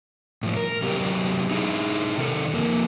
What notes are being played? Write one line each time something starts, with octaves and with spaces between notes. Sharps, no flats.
A2 F3
A#4
C3 F#3 B3 G4
D#4 E4 G#4
C3 D#3 A4
F2 A#3